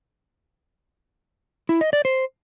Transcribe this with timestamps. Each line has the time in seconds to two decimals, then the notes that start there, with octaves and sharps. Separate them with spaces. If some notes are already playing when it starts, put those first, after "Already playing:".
1.69 E4
1.81 D#5
1.93 D5
2.05 C5